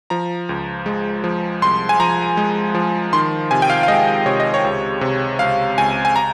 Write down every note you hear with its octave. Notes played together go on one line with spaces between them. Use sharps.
F3 A#5
C#2
G#3
F3
C2 C6
G#5
F3 A#5
G#3
F3
D#3 C6
C3 G#5
G5
F5
F5
G#3 D#5
C3 C#5
D#5
C#5
C#2
C3
C#2 F5
C#2 G#5
G#5
A#5